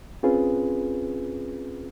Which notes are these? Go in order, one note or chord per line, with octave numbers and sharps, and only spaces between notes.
C4 C#4 F4 G#4 B4